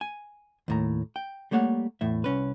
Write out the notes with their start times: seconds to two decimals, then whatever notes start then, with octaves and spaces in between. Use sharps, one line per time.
0.01 G#5
0.68 D#2 A2 A#5
1.16 G5
1.51 G3 A3 A#3 C#5 F5 F#5
2.01 E2 A2 E5
2.24 C2 C#4 B4